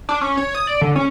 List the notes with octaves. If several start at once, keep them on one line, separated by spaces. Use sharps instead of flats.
D4
C#4
C#5
D#6
D5
D3
C#4